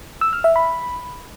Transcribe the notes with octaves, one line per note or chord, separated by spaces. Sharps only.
E6
F6
E5
B5